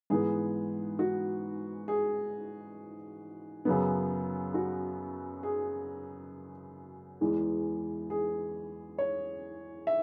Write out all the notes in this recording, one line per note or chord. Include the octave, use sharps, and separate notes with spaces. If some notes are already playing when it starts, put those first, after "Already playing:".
G#2 E3 B3 G#4
F#4
G#4
F#2 C#3 F#3 B3
F#4
G#4
E2 E3 G#3
G#4
C#5
E5